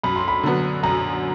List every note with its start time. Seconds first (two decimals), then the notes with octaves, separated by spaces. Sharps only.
0.03 F#2 B5
0.16 C6
0.28 B5
0.43 D3 F#3 B3
0.83 F#2 A#5